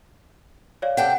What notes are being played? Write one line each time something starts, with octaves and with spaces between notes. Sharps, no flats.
C#5 D5 F5
C3 A4 F#5 G5